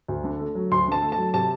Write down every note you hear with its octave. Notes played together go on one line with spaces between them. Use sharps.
D2
D3
A3
F#3
D2 C6
D3 A5
A3
A5
F#3
C3 A5